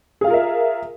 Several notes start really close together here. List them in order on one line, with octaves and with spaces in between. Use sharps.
G#4 F5 F4 A#4 E5